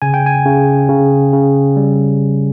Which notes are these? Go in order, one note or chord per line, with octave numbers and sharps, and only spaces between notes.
C#3 G#5
G5
G#5
C#3
C#3
C#3
G3